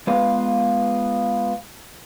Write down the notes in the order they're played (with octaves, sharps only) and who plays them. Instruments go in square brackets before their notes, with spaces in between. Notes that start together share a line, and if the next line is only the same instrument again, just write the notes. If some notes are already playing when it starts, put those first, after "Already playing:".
[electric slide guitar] G#3 B3 F4 B4 F5